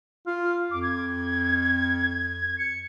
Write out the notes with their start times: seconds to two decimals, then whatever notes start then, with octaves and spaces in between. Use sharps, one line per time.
0.26 F4 F6
0.71 F2 D6
0.83 G#6
2.58 C#7